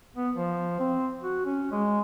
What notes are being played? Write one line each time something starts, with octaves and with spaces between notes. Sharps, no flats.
B3
F3
C4
F#4
C#4
G#3